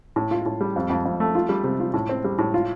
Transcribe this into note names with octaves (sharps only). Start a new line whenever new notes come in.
A2
F4
A2
G3
F2
F2
F2
A3
F4
G3
C3
F4
A2
C4
G3
A2
F4